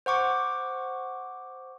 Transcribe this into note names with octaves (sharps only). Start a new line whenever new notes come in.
C5 F#5 C#6 D6